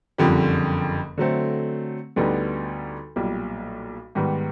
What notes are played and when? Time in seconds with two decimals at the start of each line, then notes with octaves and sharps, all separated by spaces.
0.18 F#1 F2 D3 G3
1.18 D3 F#3 A3 C4
2.16 D2 D3 G3 B3 D#4
3.16 B1 A#2 G3
4.15 G#2 D#3 G3 B3